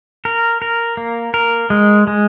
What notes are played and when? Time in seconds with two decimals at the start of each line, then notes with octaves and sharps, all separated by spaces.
0.25 A#4
0.62 A#4
0.97 A#3
1.34 A#4
1.70 G#3
2.07 G#3